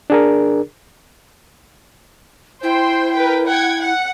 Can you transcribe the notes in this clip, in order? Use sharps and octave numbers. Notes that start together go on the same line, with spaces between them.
D4 G#4 A#4
E4 C5 G5 C6
A#4 B4 G5
F#5 G5 G#6
F#5